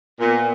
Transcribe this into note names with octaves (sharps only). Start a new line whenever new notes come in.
A#2 B3